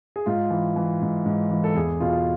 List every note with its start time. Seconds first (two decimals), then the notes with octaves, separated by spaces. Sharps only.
0.16 G#4
0.26 G#2 F4
0.50 E3
0.76 E3
1.01 G#2
1.25 G#2
1.50 E3
1.64 A4
1.75 E2 G#4
2.00 B2 F4